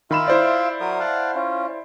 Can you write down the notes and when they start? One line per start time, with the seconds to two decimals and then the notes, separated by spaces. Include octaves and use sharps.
0.11 D#3 F4 E5 F5 B5 E7
0.28 E4 C5 D5
0.81 F#3 A#4 D#6
1.00 F5 F#5 A5
1.35 C#4 F4